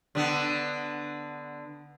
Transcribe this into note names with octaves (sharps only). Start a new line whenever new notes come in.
D3 B3